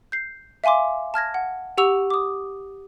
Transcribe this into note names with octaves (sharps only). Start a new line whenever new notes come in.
G6 C7
E5 F5 G#5 C6 D6
A5 F6 G#6 A#6
F#5
G4 F#5 C#6 E6 F7
D6 D#6